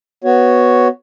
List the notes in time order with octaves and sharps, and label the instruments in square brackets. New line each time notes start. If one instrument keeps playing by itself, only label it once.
[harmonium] B3 F#4 C#5